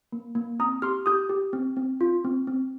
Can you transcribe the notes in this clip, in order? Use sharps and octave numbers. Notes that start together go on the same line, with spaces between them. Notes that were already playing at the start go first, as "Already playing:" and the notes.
A#3
A#3
C4 A#5 D#6
G4 C6 F6
G4 D#6 G6
G4
C4
C4
F4
C4
C4